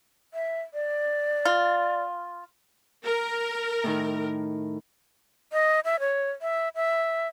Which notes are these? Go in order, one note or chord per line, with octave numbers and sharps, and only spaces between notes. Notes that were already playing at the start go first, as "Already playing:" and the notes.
E5
D5
F4
A#4
A2 D#3
D#5
E5
C#5
E5
E5